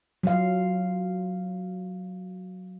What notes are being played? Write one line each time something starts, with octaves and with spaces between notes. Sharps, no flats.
F#3 F5